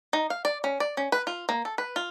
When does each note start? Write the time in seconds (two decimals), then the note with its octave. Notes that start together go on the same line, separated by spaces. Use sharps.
0.13 D#4
0.30 F5
0.45 D5
0.64 C#4
0.80 D5
0.97 C#4
1.12 B4
1.27 F4
1.49 A#3
1.65 A4
1.78 B4
1.96 F4